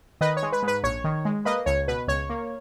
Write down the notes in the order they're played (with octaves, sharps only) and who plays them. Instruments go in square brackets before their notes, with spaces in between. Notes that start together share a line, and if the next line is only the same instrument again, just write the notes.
[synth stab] D#3 B4 D#5
C#5
G#3
B4
G#2
B4
A#1 C#5
D#3
G#3
A#3 B4 D#5
C#2 C#5
B2 B4
C#2 C#5
A#3